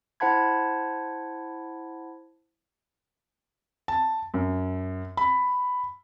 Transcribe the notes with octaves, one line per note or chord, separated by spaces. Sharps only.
E4 C5 F#5 A5 B5 G#6
A5
F#2
B5